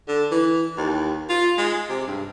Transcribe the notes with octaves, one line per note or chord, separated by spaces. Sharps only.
D3
E3
D#2
F4
G#3
C3
G2